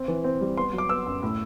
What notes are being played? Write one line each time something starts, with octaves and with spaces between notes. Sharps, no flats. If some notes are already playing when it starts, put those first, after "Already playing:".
Already playing: C4
E3
C4
G3
B3 C6
F#3
D6
B3 E6
F#2
A2